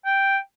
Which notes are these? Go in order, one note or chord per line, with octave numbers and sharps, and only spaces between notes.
G5